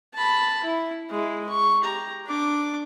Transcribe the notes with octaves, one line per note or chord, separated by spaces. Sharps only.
A5 B5
E4
G#3 E4
C#6
G4 A#5
D4 D6